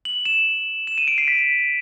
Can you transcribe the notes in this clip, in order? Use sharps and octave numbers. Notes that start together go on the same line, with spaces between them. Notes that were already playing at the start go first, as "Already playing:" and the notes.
F#7
E7
E7
D#7
D7
C7
B6